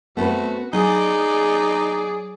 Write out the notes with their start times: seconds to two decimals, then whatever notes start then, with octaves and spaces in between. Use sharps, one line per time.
0.17 A3 B3 C4 F#4 B4
0.73 F#3 D#4 G#4 D5 G#5